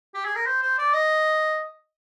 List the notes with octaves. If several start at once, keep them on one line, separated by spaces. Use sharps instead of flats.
G4
G#4
A#4
C5
C5
D5
D#5